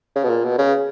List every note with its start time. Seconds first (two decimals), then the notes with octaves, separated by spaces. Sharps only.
0.16 C#3
0.23 B2
0.30 A#2
0.44 B2
0.58 C#3